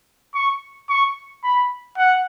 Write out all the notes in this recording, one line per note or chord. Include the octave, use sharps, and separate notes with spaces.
C#6
C#6
B5
F#5